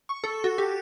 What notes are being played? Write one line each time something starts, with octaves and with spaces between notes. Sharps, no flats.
C#6
A4
F#4
G4